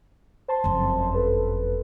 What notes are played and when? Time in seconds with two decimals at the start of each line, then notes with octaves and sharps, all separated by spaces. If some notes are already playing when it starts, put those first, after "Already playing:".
0.48 C5 A5 C6
0.64 F#1 F2
1.14 A4 B4